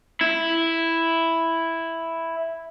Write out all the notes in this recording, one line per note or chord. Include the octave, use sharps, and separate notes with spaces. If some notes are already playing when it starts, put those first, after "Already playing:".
E4